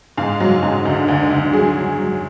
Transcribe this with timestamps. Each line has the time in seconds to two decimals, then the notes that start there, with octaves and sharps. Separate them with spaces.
0.17 G#2 F5
0.40 F#3
0.63 G#2
0.85 D2
1.08 D2
1.31 D2
1.53 F#3 G#4
1.76 F#3
1.99 F#3